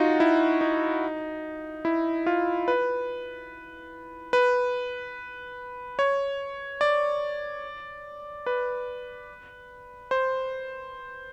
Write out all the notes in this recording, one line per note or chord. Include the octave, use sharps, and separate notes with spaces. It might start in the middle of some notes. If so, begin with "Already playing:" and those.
Already playing: D#4 F4 F#4
E4
D#4
E4
F4
B4
B4
C#5
D5
B4
C5